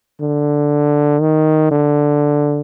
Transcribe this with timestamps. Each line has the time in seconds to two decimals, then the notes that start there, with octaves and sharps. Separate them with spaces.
0.20 D3
1.21 D#3
1.71 D3